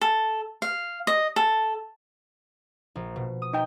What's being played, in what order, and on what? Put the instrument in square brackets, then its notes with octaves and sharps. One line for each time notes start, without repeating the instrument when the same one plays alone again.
[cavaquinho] A4
F5
D#5
A4
[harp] A#1
B2
D#6
[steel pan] D#4 G5